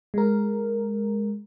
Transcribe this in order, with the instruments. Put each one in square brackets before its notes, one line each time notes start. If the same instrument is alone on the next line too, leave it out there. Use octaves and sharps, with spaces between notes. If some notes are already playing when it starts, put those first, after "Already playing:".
[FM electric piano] G#3 A#4